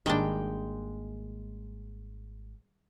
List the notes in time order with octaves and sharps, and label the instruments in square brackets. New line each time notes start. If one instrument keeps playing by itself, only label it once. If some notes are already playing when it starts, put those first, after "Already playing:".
[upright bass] G#1 A#3 [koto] D#3 G3 D4 [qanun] G#3 G5